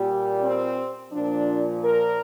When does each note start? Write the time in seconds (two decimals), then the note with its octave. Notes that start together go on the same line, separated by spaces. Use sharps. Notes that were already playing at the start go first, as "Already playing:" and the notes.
Already playing: A#2 G3
0.41 C4
1.12 A#2 F3 D4
1.83 A#4